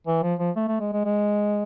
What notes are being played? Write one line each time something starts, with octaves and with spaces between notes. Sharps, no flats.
E3
F3
F3
A3
A3
G#3
G#3
G#3